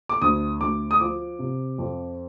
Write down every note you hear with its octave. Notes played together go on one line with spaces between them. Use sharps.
D6
D2 D#6
D2 D6
D#6
F3 D6
C3
F2